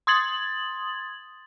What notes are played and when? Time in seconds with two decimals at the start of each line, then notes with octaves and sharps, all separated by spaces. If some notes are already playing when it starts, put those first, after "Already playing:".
0.07 C6 D#6 G#6 A6 F#7